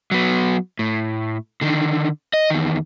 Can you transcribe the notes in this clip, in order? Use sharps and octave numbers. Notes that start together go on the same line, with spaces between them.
F#3 B3
A2
D3 D#3
D#5
E2 D#3